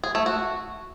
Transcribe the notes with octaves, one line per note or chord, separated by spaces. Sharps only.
G#4
A3
F#4